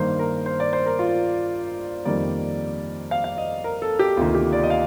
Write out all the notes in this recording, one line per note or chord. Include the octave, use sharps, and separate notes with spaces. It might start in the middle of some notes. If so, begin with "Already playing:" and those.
Already playing: G2 D#3 A#3 C5
A#4
C5
D5
C5
A#4
F4
F2 D#3 G3 A#3 D5
F5
F5
D#5
A#4
A4
G4
D2 C3 D#3 A#3 F4
G4
D5
D#5
F5